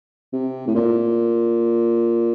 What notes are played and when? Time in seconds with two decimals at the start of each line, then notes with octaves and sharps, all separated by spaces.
0.33 C3
0.67 A2
0.75 A#2